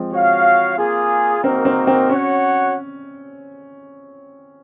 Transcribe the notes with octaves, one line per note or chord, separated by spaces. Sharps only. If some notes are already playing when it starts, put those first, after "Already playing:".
Already playing: F3 G#3 C4
F#4 C#5 F5
A#3 F4 G#4
A#3 C4 D#4 F#4 A#4
C4
C4
C#4 F#4 C#5 F#5